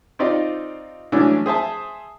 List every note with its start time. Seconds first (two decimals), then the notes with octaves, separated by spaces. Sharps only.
0.19 C4 D#4 F4 G4 D5 D#5
1.12 E3 F#3 G#3 A3 C#4 D4
1.46 G#4 C5 E5 A5